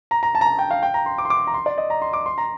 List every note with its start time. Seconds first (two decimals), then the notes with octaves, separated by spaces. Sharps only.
0.11 A#5
0.23 A#5
0.35 A5
0.41 A#5
0.47 A5
0.59 G5
0.71 F5
0.83 G5
0.94 A#5
1.06 C6
1.18 D6
1.25 C6
1.30 D6
1.47 A#5
1.54 C6
1.66 D5
1.78 D#5
1.90 A#5
2.02 C6
2.13 D6
2.26 C6
2.38 A#5